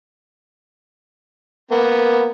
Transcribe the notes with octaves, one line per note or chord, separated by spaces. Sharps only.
A#3 B3